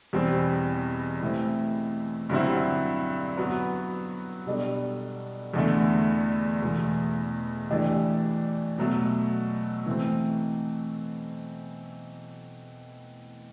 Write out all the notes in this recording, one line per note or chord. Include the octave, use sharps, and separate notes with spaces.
E2 B2 G3 C4
E3 A3 C4 E4
G2 D3 F#3 C4 E4
F#3 B3 F#4
B2 G3 D4 A4
E2 D3 A3
E2 B2 A3
E3 A3 D4 G4
B2 F#3 A3
E3 A3 C4